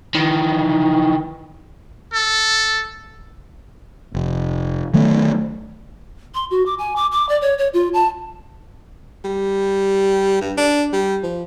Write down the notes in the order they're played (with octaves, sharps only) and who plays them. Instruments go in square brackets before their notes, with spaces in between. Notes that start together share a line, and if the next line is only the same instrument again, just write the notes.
[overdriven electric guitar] D#3 E3
[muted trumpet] A4
[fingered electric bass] F1
D#3 F#3 A3
[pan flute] C6
F#4
D6
G#5
D6
D6
D5
C#5
C#5
F4
A5
[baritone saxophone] G3
G2
D4
G3
F3